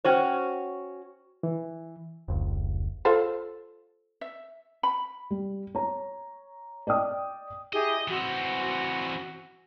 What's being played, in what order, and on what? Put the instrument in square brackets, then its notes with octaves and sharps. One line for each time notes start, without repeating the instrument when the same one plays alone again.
[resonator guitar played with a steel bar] C#4 F#4 C#5 [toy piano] C5 G5
[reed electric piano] E3
[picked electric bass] F1 C#2
[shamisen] F4 A4 C5
[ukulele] E5
B5
[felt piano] G3
C#5 A#5
D5 D#5 G5 D#6
[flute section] E4 G4 G#4 [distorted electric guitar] D#5
[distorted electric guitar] E3 C4 [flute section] F#4